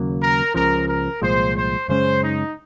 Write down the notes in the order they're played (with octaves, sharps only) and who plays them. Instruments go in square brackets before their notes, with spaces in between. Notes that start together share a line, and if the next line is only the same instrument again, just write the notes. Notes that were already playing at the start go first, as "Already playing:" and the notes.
Already playing: [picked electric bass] D#2 C#3 F#3 A#3
[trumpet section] A#4
[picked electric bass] C#2 C#3 F3 [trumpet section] A#4
[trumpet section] A#4
[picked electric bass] C2 A#2 F3 G#3 [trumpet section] C5
[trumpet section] C5
[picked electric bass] F#2 C#3 G#3 C#4 [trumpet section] C5
[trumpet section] D#4